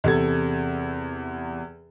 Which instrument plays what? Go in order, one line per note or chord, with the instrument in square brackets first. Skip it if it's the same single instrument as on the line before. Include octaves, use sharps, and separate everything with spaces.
[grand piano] E2 C3 A4 G#6